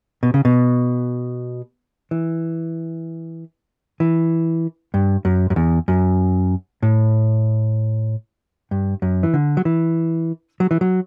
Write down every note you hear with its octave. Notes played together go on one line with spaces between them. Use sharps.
B2
C#3
B2
E3
E3
G2
F#2
F#2
E2
F#2
A2
G2
F#2
E3
D3
F#3
E3
F#3
E3
F#3